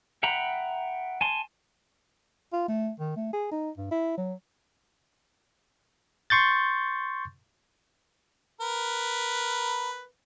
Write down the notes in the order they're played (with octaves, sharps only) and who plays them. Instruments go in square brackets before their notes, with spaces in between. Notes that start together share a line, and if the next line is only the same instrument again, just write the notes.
[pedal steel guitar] E5 F#5 G5 A#5 B5
G#5 A5 C6
[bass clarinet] F4
A3
D#3
A3
G#4
D#4
G2
E4
F#3
[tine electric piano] C6 C#6 G6 A6
[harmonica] A#4 B4